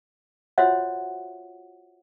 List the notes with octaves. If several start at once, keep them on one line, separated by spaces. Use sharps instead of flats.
F4 F#4 C5 C#5 E5 F#5